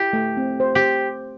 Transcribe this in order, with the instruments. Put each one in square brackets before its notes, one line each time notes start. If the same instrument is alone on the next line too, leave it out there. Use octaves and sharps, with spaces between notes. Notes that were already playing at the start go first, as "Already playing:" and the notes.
Already playing: [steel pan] E4 [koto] G4
[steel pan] A3
C4
C5
[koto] G4